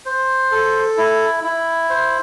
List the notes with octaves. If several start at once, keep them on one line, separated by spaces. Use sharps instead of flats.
C5
A4
E4
E4
C5